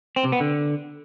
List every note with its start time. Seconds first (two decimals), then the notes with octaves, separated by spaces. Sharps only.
0.16 C4
0.24 C3
0.32 B3
0.40 D3